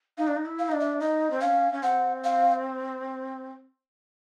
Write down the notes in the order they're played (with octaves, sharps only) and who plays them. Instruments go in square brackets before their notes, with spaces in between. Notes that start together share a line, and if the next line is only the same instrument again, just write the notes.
[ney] D#4 [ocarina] F5
[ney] D4
D#4
E4
[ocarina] F5
[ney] D#4
[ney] D4 [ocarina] D#5
[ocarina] E5
[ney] D#4 [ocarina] D#5
[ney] C4
[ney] C#4 [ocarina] F5
[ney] C#4
[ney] C4 [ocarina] F#5
[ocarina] F5